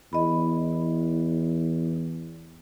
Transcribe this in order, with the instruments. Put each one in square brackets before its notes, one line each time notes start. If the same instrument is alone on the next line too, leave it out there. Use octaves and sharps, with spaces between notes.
[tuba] E2 [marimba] D#5 B5